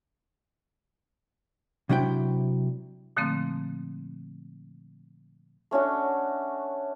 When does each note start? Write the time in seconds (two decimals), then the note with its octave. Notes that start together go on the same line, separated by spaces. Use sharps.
1.89 C3 F#3 D4 E4 G5
3.17 A#2 D3 F3 A3 A#3 C4
5.71 A3 C#4 D4 F#4